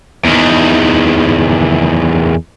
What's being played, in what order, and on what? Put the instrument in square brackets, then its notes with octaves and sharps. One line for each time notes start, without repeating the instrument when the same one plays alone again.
[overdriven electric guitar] E2 D#3